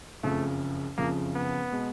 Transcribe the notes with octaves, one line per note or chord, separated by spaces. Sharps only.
F#1 F2 C#3 F3 A3
F#1 F2 C#3 F3 A#3
B3
B2 G#3